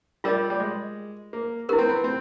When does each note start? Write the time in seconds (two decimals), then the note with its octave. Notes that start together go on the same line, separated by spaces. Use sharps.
0.24 G3 F4 A#4 D#5
0.50 G3
0.60 G#3
1.33 A#3
1.69 B3 E4 G4 A#4
1.79 C4
1.89 B3
2.04 C4